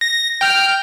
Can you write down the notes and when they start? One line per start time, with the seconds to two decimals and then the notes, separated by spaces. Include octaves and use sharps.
0.01 A#6
0.41 G5 F6